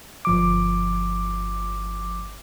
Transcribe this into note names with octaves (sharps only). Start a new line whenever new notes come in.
G1 F3 D6